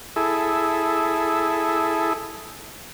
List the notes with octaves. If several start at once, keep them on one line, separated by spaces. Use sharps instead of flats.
E4 G#4 A4